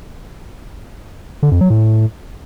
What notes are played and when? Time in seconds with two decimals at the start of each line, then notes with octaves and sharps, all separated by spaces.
1.43 D3
1.52 F2
1.61 F#3
1.70 A2